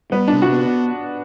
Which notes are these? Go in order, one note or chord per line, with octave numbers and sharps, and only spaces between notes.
G3 B3
D4
C3
F#4
B3